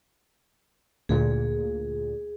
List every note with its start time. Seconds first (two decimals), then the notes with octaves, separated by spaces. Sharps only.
1.09 D2 A#2 G#4